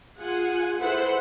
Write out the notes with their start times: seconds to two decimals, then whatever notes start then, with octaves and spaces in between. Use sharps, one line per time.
0.18 F4 G#4 F#5 G#5
0.79 E4 G#4 A4 B4 C5 F#5